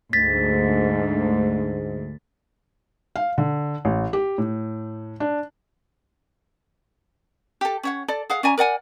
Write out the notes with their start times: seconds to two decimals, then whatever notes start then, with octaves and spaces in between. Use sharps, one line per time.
0.13 D2 G#2 A6 B6
3.16 F5
3.38 D3
3.85 A1
4.13 G4
4.38 A2
5.20 D4
7.61 G4 A4
7.83 C#4 C#5 F#5
8.08 A4 D5
8.30 G#4 F5 F#5
8.43 C#4 D5 G#5 A#5
8.58 A#4 D5 F#5 G#5